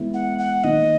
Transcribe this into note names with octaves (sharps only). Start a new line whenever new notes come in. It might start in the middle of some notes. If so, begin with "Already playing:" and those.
Already playing: E3 G#3 B3 E4
F#5
F#5
D#3 A#3 D#4 D#5